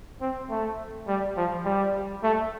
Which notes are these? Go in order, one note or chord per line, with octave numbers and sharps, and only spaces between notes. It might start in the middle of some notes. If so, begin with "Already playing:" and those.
C4
A3
G3
F3
G3
A3